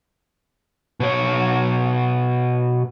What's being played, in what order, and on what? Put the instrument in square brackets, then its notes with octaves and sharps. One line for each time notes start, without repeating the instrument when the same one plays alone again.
[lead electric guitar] B2 C#5